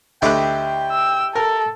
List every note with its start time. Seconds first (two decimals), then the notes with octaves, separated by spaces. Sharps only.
0.22 D2 A3 E4 G4 D#5 G5 F#6
0.92 E6
1.35 A4 A#4